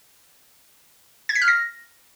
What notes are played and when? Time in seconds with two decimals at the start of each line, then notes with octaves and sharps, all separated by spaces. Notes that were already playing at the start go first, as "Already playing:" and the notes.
1.29 G#6
1.35 B6
1.42 F6
1.48 A#6